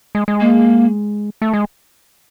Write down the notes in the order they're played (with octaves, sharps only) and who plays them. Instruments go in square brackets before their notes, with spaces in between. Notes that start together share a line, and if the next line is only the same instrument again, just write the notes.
[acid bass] G#3
G#3
[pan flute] A#3
[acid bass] A3
G#3